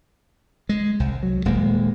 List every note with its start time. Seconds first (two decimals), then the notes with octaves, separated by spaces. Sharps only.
0.69 G#3
1.00 C2
1.23 F#3
1.45 D#1 G#3 A#3